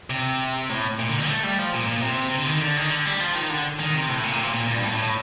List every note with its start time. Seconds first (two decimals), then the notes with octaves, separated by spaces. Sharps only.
0.10 C3
0.69 A2
0.99 A#2
1.09 D3
1.18 D#3
1.28 A3
1.43 G3
1.59 F3
1.73 A#2
1.87 A#2
2.03 C3
2.30 C3
2.38 D3
2.46 D#3
2.61 D3
2.77 D#3
2.90 D3
3.05 G3
3.20 F3
3.35 D#3
3.50 D3
3.80 D#3
3.94 C3
4.09 A2
4.23 A#2
4.34 C3
4.44 A#2
4.54 A#2
4.68 A#2
4.76 G2
4.83 A2
4.97 A2